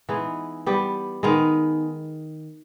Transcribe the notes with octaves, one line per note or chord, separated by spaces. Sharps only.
E3 G#3 B3 D#4
G3 B3 G4
D#3 G#3 B3 D#4